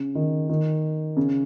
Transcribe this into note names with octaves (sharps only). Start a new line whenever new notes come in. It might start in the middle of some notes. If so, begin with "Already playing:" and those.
Already playing: C#3
D#3
D#3
C#3